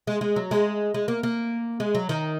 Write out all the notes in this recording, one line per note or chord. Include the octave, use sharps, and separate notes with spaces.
G#3
G#3
F#3
G#3
G#3
A#3
A#3
G#3
F#3
D#3